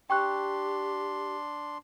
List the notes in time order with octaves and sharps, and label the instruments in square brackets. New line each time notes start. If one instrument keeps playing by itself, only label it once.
[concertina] D4 C6 [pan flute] G4 [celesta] G5 C#6 F#6